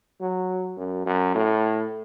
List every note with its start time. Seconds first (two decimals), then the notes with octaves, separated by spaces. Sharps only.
0.21 F#3
0.77 F#2
1.06 F#2
1.35 A2